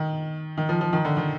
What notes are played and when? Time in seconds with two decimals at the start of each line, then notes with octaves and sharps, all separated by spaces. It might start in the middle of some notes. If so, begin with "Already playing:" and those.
Already playing: D#3
0.58 D#3
0.69 F3
0.81 F3
0.93 D#3
1.05 D3
1.17 D#3